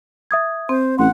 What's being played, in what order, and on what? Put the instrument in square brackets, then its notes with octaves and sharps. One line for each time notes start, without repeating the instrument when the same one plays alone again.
[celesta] E5 D#6 G#6
[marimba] C4 [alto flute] C5
[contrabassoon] A1 [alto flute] F#5 [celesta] C6